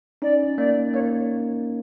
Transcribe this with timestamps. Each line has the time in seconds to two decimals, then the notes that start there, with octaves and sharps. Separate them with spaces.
0.22 C#4 D#4 D5
0.58 A#3 D5
0.94 A#3 C#5